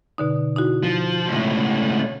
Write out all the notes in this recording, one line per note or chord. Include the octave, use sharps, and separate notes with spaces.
B2 D3 D#4
D#4 E4 F#4
F3
C#2 A2